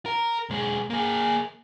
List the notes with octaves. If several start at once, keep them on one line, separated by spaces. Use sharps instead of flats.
A#4
B1 G#3
A#3 G#4